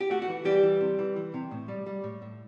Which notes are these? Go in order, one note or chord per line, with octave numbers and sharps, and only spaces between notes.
G4
A3 F#4
F#4
E3
E3 G3 G4
E3
C3
E3
E3
C3
A2
G3
G3
A2
A2